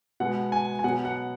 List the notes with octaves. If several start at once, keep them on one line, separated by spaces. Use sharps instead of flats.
B2 G#3 B3 F#5
G#5
G#5
B2 F#3 B3 F#5
F#5